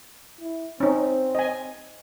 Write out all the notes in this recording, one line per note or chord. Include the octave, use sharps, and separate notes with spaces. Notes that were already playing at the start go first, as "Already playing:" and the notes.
E4
C4 C#4 D#4
D#5 G#5